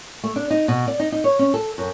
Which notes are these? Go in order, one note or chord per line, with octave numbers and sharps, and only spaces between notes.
A3
D4
D#4
B2
D5
D#4
D#4
C#5
C#4
A4
F#2